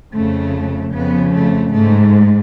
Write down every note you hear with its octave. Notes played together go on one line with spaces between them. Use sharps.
F2 C#3 A3
F2 C#3 B3
A3
G#2 A3